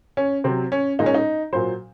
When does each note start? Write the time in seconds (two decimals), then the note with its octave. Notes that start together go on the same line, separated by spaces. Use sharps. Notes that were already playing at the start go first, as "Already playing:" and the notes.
0.17 C#4
0.44 C3 F#3 C4
0.72 C#4
0.99 A#2 G#3 D#4
1.06 C#4
1.14 D#4
1.53 A#2 F#3 C5